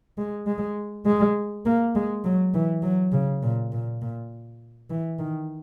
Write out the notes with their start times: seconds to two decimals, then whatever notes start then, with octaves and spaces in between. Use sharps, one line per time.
0.18 G#3
0.46 G#3
1.06 G#3
1.65 A#3
1.95 G#3
2.24 F#3
2.54 E3
2.83 F#3
3.12 C#3
3.42 A#2
3.72 A#2
4.02 A#2
4.90 E3
5.19 D#3